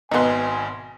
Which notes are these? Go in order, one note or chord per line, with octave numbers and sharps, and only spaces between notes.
G#1 B2 B3 D#4 G#5 C6